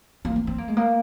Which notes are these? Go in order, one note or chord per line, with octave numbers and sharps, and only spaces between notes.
A#3
C4
C4
A#3
G#3
A#3